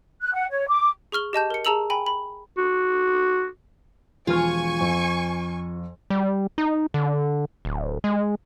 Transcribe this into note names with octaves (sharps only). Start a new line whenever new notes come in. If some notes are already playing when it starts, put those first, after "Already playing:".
F#6
F#5
C#5
D6
G#4 C#6 F6 G7
G4 D#5 A5 G6
A#4 C#7
G#4 A5 A#5 E6 F7 F#7
G5 G#5 B5
B5
F#4
E1 F3 F4 G#5 C#6 F6
F2
G3
D#4
D3
D1
G#3